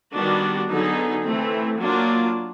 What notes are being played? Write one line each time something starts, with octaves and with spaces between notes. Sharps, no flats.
D#3 G3 B3 D4 F#4
D3 F#3 B3 D#4 G#4
E3 A3 C4
F#3 A#3 D4 F4